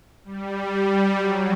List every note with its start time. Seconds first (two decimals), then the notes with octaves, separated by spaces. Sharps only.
0.25 G3
0.72 G3
1.18 F#3